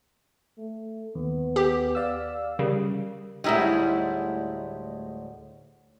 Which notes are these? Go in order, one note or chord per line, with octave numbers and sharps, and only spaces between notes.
A3
D#2 B3
G4
D5 F5 E6
C#3 G3 A#4
D2 A2 G3 G#3 D#4 E4